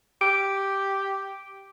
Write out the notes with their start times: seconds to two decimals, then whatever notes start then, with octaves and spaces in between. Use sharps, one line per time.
0.21 G4 D7